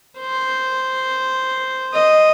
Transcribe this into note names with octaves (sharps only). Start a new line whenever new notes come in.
C5
D#5